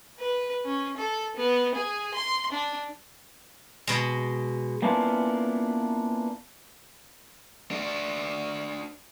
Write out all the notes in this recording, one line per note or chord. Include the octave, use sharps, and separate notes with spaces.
B4
C#4
A4
B3
G#4
C6
D4
B2 G#3
A#3 B3 C#4 D4 E4 F4
D4 F#4